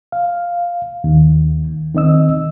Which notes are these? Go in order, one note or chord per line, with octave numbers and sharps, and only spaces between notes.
F5
D#2 D#3
D#3 C4 D#5 E6